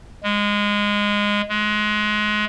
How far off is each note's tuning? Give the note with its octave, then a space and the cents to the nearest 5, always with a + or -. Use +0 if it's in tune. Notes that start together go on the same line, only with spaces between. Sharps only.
G#3 -15
G#3 +25